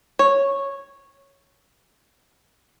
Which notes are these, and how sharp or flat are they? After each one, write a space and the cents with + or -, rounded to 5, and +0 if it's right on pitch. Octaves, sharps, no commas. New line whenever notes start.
C#5 -5